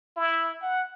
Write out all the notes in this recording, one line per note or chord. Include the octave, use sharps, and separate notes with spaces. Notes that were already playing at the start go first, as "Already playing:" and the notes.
E4
F#5